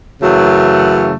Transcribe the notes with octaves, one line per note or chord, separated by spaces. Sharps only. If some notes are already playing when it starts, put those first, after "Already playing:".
F#2 C#3 E3 F#3 A3